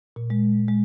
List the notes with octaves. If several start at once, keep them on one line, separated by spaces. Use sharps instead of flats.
A#2
G#3
G#3